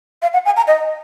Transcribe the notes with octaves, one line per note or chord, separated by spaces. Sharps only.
F5
F#5
G#5
A#5
D#5